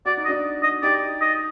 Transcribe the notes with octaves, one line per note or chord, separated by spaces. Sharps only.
F#4 D5
D#4
D#5
D4 F#4
D#5
D#4 G4 D5
D#5